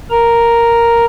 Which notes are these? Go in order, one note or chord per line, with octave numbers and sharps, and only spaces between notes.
A#4 A#5